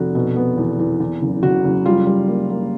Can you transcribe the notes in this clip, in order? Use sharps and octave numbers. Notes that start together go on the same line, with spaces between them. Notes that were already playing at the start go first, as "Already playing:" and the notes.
Already playing: F1 F#4
B2
B3
E2
E2
E2
F#1
F#1 F#4
F#1
G3 F4
G3
A#3
A#3